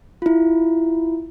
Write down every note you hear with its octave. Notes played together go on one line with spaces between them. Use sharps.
E4 F4